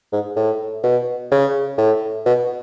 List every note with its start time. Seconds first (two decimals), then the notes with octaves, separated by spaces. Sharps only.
0.13 G#2
0.36 A2
0.83 B2
1.32 C#3
1.78 A2
2.26 B2